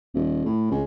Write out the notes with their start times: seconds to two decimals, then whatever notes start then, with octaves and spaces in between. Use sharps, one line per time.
0.14 D#1
0.45 A2
0.71 C#2